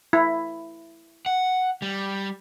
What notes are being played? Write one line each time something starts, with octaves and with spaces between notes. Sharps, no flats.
E4
F#5
G3